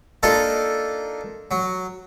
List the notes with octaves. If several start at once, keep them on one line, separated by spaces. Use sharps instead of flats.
A#3 D4 D#4 F4 A4
F#3